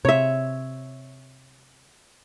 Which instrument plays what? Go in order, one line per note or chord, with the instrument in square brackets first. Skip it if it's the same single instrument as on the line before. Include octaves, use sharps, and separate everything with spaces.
[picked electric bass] C3 [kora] C#5 E5